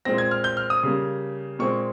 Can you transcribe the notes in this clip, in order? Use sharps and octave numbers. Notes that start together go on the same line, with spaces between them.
A#2 G#3 C4 A#6
G#6
F6
G6
F6
D#6
C#3 G3 A#3
A#2 G#3 C4 C#6